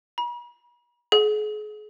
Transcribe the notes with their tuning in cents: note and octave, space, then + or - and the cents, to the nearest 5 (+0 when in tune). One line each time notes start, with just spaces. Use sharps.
B5 -45
G#4 +35